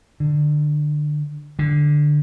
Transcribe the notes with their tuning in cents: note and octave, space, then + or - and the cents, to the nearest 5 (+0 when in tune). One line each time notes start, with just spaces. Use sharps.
D3 +25
D3 +10